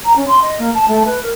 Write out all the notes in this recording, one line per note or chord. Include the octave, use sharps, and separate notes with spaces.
A#5
C#4
C6
D#5
A#3
A5
A3
B4
A#4